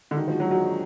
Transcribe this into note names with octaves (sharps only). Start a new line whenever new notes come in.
D3
A#2 D#3 G#3 D4 F#4
F3
F#3
F#3